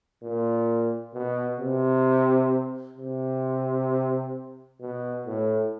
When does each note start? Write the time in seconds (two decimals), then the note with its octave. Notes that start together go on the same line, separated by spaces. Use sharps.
0.22 A#2
1.14 B2
1.60 C3
2.98 C3
4.81 B2
5.26 A2